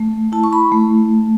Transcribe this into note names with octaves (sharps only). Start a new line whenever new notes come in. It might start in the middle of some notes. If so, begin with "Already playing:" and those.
Already playing: A3
E4 A5
C#6
B5
A3